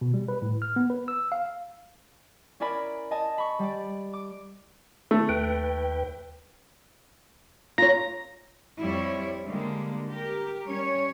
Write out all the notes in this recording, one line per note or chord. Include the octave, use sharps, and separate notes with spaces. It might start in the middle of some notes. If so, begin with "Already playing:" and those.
B2
G3
B4
A2
F6
B3
B4
E6
F5
C#4 E4 A#4 D5 G#5 B5
D#5 G#5 A5
B5 C#6
G3 D5
D6
A3
D#2 B4 G5
F4 C#5 A#5
F2 G3 E4 C#5
D3 G3 G#3 A#3
G4 A#4
G3 C#4 C#5